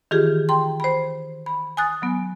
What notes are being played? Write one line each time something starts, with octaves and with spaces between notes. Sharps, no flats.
D#3 E3 F4 G4 G#4
G5 A#5 C6
C5 B5
B5
G#5 D#6 F#6 A6
F#3 B3